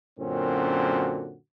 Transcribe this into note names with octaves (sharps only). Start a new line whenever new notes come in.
F#2 A#2 D3 C4 C#4 F#4